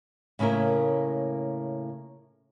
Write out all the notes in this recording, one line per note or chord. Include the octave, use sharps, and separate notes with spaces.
A2 C#3 A#3 E4 A#4